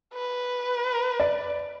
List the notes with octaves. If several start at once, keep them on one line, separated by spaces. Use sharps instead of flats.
B4
D5